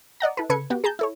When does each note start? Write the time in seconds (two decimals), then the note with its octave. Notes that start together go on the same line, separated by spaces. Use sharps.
0.20 D5 D#5 F#5 A#5
0.37 E4 A4 B4
0.50 C#3 A4 B4 G#6 C#7
0.70 B3 F#4 G4
0.84 G#4 A5 A#5 G6
0.99 E4 A4 C#5